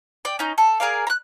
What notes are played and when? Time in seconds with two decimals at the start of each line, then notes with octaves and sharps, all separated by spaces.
0.25 D5 G5
0.39 C#4 D#4
0.58 A4
0.80 G#4 A#4 D5 F5
1.07 A#5 F#6